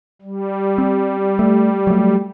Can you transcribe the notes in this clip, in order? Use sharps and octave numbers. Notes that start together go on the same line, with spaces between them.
G3
C4
A3
F#3 A3